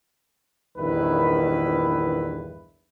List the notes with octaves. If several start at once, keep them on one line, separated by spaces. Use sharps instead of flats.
A#1 E2 G2 D#3 E4 B4